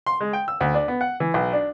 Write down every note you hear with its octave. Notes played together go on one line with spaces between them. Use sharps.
C6
G#3
G5
E6
D2
D4
B3
F#5
E3
B1
D4